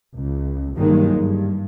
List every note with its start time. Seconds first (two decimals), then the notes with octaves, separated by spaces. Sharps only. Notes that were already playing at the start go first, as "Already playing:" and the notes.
0.14 C#2
0.76 G1 G2 D#3 F#3 G#3 A#3
1.16 G2